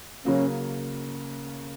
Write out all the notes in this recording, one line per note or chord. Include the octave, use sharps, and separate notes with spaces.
C#3 F#3 A#3 C#4